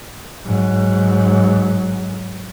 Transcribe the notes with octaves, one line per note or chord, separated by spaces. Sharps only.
G#2 F#3